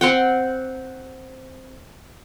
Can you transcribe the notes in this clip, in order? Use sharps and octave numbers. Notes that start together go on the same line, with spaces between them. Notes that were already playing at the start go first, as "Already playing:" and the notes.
C4 F#5 G5